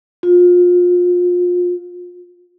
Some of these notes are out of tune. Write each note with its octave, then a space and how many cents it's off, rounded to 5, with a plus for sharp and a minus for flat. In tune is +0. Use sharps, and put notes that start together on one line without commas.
F4 +30